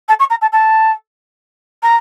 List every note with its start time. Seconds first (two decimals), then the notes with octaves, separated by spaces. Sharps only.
0.08 A5
0.19 C#6
0.30 A#5
0.41 A5
0.52 A5
1.83 A#5